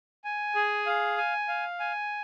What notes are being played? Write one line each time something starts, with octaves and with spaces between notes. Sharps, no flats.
G#5
G#4
F5
G#5
F5
G#5